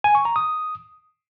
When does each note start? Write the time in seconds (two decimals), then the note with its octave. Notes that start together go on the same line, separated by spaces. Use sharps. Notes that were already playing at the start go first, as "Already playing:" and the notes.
0.04 G#5
0.15 C#6
0.25 A#5
0.36 D#6